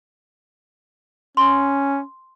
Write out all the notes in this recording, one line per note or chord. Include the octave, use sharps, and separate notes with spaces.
C#4 C6